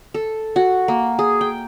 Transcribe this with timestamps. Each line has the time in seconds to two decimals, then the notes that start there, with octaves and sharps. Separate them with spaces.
0.14 A4
0.56 F#4
0.88 A#3
1.19 G#4
1.41 G5